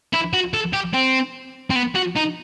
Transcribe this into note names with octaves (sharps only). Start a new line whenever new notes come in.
E4
F#4
A4
G4
C4
C4
B3
F#4
D#4